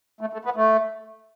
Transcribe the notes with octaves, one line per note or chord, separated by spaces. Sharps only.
A3
A3
B3
A3